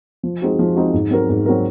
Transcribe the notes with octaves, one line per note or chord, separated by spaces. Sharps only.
F3
G#3 C4 D#4 F#4
F3
G#3 C4 D#4 F#4
G#2
F#3 C4 F#4 A#4
G#2
F#3 C4 F#4 A#4